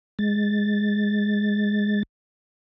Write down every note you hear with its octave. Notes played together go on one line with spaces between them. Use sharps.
G#3 A6